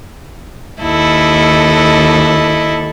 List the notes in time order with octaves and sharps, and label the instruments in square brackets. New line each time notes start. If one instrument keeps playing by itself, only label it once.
[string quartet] D#2 A4 [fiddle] E4 D#5